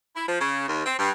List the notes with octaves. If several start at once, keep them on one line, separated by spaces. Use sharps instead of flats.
E4
F3
C#3
D#2
C4
G2